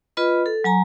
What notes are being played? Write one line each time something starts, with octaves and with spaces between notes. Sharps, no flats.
F4 B4 D#5 B5
A4
F#3 G#5 A#5